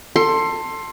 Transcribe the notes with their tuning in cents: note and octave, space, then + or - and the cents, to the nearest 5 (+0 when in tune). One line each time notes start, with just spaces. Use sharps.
A4 +25 C6 +15